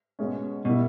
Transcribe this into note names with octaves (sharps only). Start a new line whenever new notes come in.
B2 G#3 C#4
B2 G3 A#3 E4